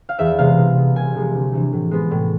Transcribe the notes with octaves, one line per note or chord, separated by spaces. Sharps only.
F5
E2 E5
C3 G#3 B3 F5
B2
B3
C2 G#5
C3 F3 G#3
D2
C3 E3
A2
G#3 B3
A2